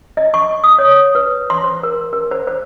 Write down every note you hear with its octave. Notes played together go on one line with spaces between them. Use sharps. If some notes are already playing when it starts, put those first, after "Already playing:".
D#5
C#6
D#6
C#5
D#6
B4
C6
C5
A#4
A#4
C5
C5